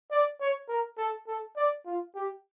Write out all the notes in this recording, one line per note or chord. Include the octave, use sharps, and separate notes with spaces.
D5
C#5
A#4
A4
A4
D5
F4
G4